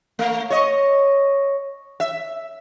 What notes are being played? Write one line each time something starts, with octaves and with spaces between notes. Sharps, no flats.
A3
C#5 D#5
E5